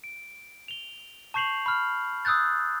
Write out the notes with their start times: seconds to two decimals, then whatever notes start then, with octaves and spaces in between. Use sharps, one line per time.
0.04 D7
0.68 F7 G7
1.34 A5 C#6 G6 C7 F7 F#7
1.66 B5 F6
2.25 D#6 E6 F#6 G6 A6